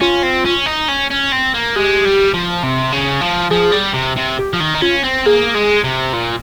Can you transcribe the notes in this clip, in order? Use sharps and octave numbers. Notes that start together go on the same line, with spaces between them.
C#4 F4
C4
C#4
D#4
C#4
C#4
C4
A#3
G#3 G4
G3
F3
C3
C#3
F3
F3 G#4
G3
C3
C3
G4
F3
D#3
D#4
C#4 F4
C4
A#3 G#4
G#3
C3
A#2